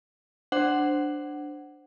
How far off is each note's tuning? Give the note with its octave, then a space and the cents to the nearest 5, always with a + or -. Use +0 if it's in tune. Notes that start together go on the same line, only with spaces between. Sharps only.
D4 +5 C5 +0 F#5 +10